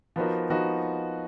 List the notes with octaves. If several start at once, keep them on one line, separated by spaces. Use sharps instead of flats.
F3 B3 D#4 F#4 A#4
F3 B3 D#4 F#4 A#4